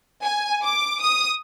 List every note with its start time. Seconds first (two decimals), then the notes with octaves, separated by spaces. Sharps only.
0.24 G#5
0.64 D6
1.01 D#6